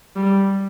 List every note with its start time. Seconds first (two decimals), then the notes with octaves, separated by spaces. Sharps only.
0.16 G3